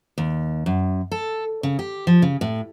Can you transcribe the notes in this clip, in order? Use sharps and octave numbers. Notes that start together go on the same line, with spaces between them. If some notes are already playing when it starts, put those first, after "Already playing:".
D#2
F#2
A4
C#3
G4
F3
C#3
A2